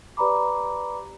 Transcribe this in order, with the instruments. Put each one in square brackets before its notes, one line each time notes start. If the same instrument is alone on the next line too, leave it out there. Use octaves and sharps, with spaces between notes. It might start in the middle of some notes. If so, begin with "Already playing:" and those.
[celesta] G4 B4 D5 A#5 B5 D6